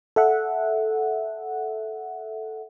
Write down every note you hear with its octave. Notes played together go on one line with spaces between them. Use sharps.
A4 E5 F#5